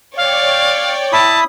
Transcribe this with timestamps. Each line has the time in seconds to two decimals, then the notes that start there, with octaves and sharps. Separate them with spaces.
0.17 C#5 D5 F5 G5
1.13 E4 A5 B5 D#6